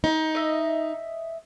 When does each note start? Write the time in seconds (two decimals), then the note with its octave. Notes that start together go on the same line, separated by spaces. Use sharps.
0.04 D#4
0.35 D#5 E5